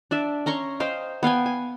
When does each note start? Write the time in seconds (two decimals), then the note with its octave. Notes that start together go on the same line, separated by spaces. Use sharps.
0.11 D4 D5 E5
0.46 C#4 A#5 C6 C#6
0.80 C5 D#5 F5 G5
1.23 B3 F5 G5 G#5
1.46 G#5